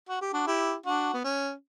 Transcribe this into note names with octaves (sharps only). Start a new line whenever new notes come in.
F#4
G4
D4 F#4
E4 G4
D4 F#4
B3
C#4